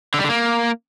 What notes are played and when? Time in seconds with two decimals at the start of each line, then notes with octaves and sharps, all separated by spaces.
0.14 D3
0.19 G3
0.24 D3
0.29 A#3